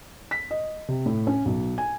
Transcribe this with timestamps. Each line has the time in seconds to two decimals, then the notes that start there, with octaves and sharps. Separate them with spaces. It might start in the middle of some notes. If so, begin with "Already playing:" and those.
0.31 B6
0.51 D#5
0.88 C3
1.06 A2
1.27 C#4
1.46 B1
1.78 G#5